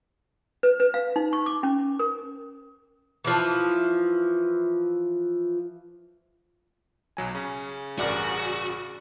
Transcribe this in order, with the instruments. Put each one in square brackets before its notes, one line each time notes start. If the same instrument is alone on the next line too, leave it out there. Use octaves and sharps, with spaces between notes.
[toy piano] B4
B4
F5
D#4
C#6
D6
C#4
A#4
[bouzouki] E3 F3
[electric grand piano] B1 F#3 G#5
[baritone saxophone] C#3 [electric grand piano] C#4
[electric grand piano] A1 G2 A#4 [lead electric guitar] F#4 [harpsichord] D5 F#5